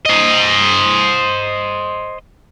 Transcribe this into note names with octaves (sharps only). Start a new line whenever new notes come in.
C5 D#5